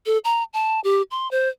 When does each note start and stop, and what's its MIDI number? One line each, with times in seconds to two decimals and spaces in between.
0.06 0.18 69
0.25 0.44 82
0.54 0.80 81
0.84 1.02 67
1.11 1.30 84
1.31 1.49 72